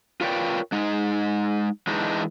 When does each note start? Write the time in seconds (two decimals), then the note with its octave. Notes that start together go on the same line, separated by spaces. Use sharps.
0.21 F4 A#4 B4 C#5 D5 G5
0.72 G#3 D#4
1.87 E3 G#3 D4 D#4